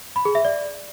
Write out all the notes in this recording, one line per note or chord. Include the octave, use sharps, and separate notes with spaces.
B5
G#4
E5
D5